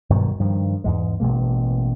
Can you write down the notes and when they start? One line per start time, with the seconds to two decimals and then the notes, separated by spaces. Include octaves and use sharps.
0.10 G2 B2 D#3 F#3
0.40 G2 D#3 F3
0.84 E2 G#2 G#3
1.20 A1 B2 G#3 A#3